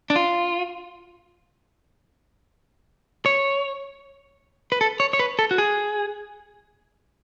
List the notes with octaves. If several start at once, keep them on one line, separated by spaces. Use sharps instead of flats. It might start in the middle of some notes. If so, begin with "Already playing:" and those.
D4
F4
C#5
B4
A4
C#5
C#5
B4
A4
F#4
G#4